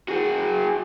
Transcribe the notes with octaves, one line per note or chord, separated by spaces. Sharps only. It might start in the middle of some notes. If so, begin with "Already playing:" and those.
F#4 G#4